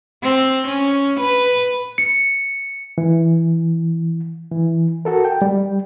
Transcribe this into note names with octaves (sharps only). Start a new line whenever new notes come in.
C4
C#4
B4
C#7
E3
E3
F#4 A4 A#4
G5
G3